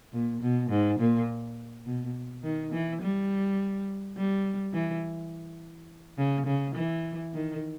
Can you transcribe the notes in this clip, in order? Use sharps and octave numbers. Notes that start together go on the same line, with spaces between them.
A#2
B2
G#2
A#2
B2
D#3
E3
G3
G3
E3
C#3
C#3
E3
D#3